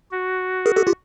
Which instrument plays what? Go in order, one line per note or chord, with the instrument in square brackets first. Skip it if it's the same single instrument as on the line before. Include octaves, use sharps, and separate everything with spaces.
[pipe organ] F#4
[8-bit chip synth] G#4 A#4
G4 A4
F4 G4